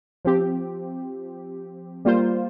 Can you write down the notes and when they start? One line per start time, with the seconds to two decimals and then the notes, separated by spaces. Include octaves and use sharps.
0.25 F3 C4 G4
2.05 G3 A#3 F4 C5